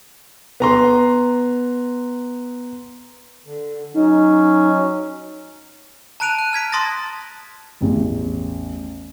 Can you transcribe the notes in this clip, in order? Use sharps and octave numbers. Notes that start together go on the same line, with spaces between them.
B3 A#5 C6
D3
F#3 C#4 D#4
A5 A#5 F#6 D7 D#7 F7
F#6
F6 G#6 B6 D7
A5 C6 D#6 A6 A#6
A1 E2